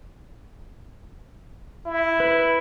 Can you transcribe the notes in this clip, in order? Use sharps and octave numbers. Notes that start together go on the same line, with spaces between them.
E4
B4